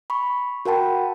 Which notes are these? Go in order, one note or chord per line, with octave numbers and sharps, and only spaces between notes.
B5 C#6
F#4 A#4 F#5 G5 A5 B5